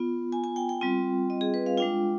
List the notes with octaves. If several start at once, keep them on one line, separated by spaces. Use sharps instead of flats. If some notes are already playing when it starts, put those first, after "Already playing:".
Already playing: B3 F4
G#5
G#5
G5
G5
G3 C4 F4
D#5
G#4
B4
F5
G#3 D4 F4 G5